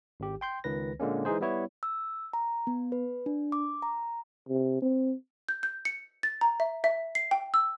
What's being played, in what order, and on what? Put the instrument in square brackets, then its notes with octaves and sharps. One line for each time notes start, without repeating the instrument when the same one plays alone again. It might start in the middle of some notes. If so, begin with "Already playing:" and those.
[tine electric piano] G#1 G4
G5 C6 G6
C#2 D#3 B4 A#6
A#2 D3 G#3 A#3 C#4
E3 G#3 D#4 G#4 C5
G3 B3 E4 C#5
[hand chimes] E6
A#5
B3
B4
D4
D6
A#5
[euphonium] C3
C4
[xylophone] G6
G6
C#7
A6
A#5
E5
E5
C7
G5
E6